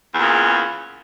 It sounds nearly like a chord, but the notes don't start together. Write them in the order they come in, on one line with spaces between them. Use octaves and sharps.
E2 A#2 C#3